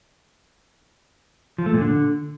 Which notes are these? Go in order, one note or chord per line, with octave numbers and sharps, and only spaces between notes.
F3
A3
A#2
D3